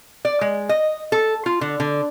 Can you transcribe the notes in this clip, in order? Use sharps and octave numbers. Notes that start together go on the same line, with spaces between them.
D5
G#3
D#5
A4
F4
D3
D3